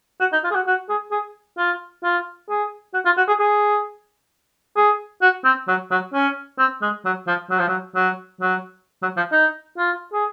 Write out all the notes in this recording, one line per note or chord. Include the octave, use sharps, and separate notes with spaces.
F#4
D#4
F4
G#4
F#4
F#4
G#4
G#4
F4
F4
G#4
F#4
F4
F#4
G#4
G#4
G#4
F#4
C4
F#3
F#3
C#4
C4
G#3
F#3
F3
F#3
F3
F#3
F#3
F#3
F#3
F3
D#4
F4
G#4